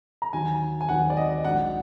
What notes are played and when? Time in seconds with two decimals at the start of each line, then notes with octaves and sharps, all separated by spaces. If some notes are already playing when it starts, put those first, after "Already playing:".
0.22 A#5
0.33 D#2 D#3 F#3 G#5
0.81 G#5
0.89 D#2 D#3 F#3 F#5
1.10 D5
1.17 D#5
1.44 A#1 G#2 F#3 F#5